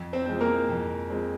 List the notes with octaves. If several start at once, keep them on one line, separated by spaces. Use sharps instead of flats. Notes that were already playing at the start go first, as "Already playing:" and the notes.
Already playing: F2
C4 C5
F3 G#3 C4
A#3 A#4
F2
F3 G#3 C4